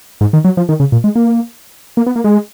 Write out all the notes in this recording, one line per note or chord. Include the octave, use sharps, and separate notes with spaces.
G#2
D#3
F#3
F3
D#3
C#3
A#2
G#3
A#3
A#3
B3
A#3
G#3